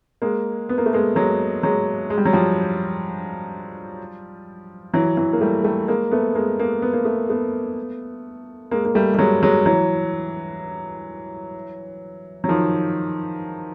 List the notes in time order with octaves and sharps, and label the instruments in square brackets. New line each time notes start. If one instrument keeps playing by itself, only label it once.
[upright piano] G#3 A#3
B3
A#3
A3
G#3 A#3
F#3 G#3
F#3 G#3
G#3
G3
F#3
F3 G3
E3 F#3
E3 F#3
A#3
G3 A3
G3 A3
G#3 A#3
A3 B3
G#3 A#3
G#3 A#3
B3
A#3
A3 B3
A3 B3
G#3 A#3
A#3
G3 A3
G3
F#3 G#3
F#3 G#3
E3 F#3
F#3
D#3 F3